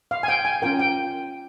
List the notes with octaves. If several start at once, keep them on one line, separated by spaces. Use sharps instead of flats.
F5
G#5
G5
G#5
C#4 F4 A#4 G5
G5